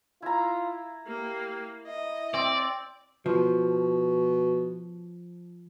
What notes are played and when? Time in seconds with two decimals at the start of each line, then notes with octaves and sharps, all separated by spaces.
0.22 E4 F4 A#5
1.07 A#3 G4
1.87 E4 D#5
2.34 C4 D5
3.26 B2 F3